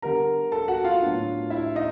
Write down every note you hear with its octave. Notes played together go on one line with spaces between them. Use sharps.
D3 G3 B3 A#4 A#5
A4 A5
F#4 F#5
F4 F5
A2 F#3 B3 D4
E4 E5
D#4 D#5